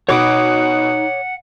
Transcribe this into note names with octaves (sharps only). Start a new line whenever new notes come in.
B2 D#4 C#5 F#5 B5 D6 D#6 D7